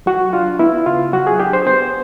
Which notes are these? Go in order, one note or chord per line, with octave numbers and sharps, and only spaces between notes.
F#3 F#4
D4 F4
B3 E4
C#3 F4
F#3 F#4
G#4
D4 G4
C5
B3 C5